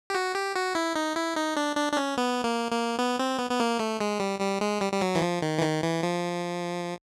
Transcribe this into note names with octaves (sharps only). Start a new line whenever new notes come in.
G4
F#4
G4
F#4
E4
D#4
E4
D#4
D4
D4
D4
C#4
B3
A#3
A#3
B3
C4
B3
B3
A#3
A3
G#3
G3
G3
G#3
G3
G3
F#3
E3
F3
D#3
E3
D#3
E3
F3